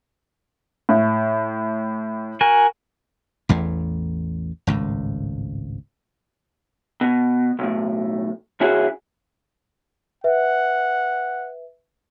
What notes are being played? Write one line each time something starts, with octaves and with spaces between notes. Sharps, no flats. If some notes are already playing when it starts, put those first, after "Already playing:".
A2
F#4 A#4 G#5
A1 E2 A2 A3
G#1 C#2 A2
B2
B1 A2
C2 C#4 E4 F#4 G#4
B4 E5 F#5